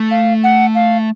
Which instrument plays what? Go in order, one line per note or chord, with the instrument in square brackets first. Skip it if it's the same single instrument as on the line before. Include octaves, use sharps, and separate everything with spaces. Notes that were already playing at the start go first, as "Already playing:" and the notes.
Already playing: [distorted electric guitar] A3
[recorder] F5
F#5
F5